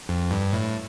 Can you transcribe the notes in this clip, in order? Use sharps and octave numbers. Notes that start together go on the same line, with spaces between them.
F2
G2
A2